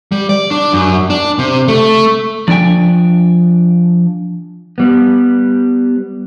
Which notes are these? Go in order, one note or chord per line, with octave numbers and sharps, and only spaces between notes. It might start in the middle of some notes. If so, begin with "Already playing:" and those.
G3
D5
D4
F#2
D4
C3
A3
F3 D4 D5 G5 G#5
G3 B3